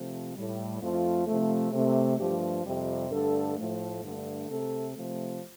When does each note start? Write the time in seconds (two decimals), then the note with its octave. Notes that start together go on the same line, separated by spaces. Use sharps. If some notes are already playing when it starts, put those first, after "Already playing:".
Already playing: C3 F3 A3
0.34 A2 G3
0.80 F2 F3 A3 F4
1.27 C3 F3 A3
1.73 C3 A3
2.18 G2 F3 A3 G4
2.64 F2 C3 G3 G4
3.11 G2 D3 A3 A4
3.57 A2 F3 A3
4.02 G2 D3 A3
4.49 C3 A3 A4
4.95 C3 F3 A3